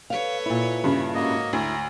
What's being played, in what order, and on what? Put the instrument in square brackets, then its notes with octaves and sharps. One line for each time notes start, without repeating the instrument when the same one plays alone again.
[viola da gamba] A4 B4 C#5 [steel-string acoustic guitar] F5
[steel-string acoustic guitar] A#2 E4
[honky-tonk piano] G2 C#3 [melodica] B5
[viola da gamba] G#2 F#4 C#5 [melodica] A#3 D#5
[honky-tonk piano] D2 [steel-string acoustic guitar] E4 [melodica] A#5